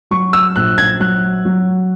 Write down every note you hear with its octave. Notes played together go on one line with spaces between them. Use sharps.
F#3 C#6
E6
A#1 F#6
G#6
F#3 F#6
F#3